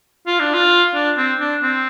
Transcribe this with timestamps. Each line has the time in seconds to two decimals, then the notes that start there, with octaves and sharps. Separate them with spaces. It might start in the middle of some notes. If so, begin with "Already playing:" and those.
0.27 F4
0.40 D4
0.54 F4
0.95 D4
1.17 C4
1.40 D4
1.63 C4